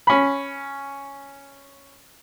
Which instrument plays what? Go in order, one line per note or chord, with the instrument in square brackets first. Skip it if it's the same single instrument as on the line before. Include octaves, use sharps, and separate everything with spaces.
[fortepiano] C#4 B5